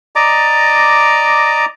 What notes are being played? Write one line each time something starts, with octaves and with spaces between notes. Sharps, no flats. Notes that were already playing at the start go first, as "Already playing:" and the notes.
D5 D#5 A#5 D6